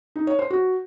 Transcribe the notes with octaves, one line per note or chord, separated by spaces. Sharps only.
D#4
C#5
C5
F#4